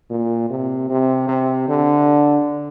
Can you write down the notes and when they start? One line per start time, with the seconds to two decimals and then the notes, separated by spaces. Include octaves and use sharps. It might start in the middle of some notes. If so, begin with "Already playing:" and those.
0.10 A#2
0.50 C3
0.90 C3
1.29 C3
1.68 D3